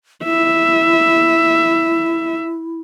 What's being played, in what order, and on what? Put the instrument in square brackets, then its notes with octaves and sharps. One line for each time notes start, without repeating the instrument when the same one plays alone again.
[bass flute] E4 [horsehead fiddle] E5